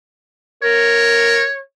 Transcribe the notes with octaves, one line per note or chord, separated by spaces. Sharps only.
A#4 C#5